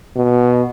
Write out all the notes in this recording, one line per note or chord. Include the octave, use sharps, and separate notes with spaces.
B2